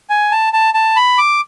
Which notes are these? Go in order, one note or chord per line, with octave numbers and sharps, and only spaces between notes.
G#5
A5
A5
A5
B5
D6